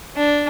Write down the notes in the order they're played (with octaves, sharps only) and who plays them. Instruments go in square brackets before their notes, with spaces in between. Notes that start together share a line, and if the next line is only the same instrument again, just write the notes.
[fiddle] D4